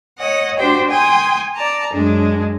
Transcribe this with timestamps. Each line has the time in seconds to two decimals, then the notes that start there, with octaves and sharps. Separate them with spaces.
0.19 C#5 D#5 F#5
0.58 D4 F#4 G4 C5 G5
0.89 G5 G#5 C6 D#6
1.55 D5 A5 A#5
1.92 F#2 G#3 D4